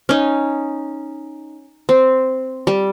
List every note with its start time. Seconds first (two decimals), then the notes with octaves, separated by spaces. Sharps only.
0.09 C#4 D#4
1.89 C4
2.67 G3